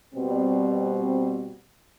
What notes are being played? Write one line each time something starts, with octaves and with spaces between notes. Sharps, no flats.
B2 G3 C4